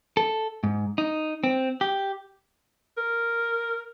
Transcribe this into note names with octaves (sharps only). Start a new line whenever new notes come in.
A4
G#2
D#4
C4
G4
A#4